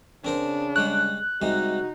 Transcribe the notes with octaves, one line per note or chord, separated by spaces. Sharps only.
C#3 C4 D4 A#4 C5
G3 G#3 C#5 F#6
C3 G3 G#3 D#4 F#4